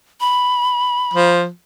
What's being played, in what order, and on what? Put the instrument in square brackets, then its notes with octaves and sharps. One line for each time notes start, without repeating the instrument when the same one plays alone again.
[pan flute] B5
[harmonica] F3